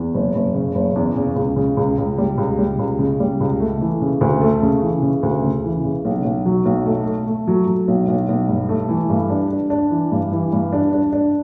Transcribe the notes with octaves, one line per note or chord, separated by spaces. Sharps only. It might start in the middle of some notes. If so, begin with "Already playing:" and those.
Already playing: E2
F#1
F#1
C#3
F#1
E2
C#3
C#2
C#3
C#2
C#2
G3
C#2
G3
C#2
C#3
G3
C#2
A3
E3
C#3
D2
A3
C#3
E3
C#3
D2
C#3
E3
C#3
B1
B1
F#3
B1
A3
A3
A3
F#3
F#3
B1
B1
B1
G2
A3
E3
G2
D4
D4
D4
E3
G2
E3
G2
D4
D4
D4